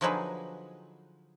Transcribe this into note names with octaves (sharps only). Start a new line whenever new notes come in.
D3 F3 F#3 D#4 G#4 B4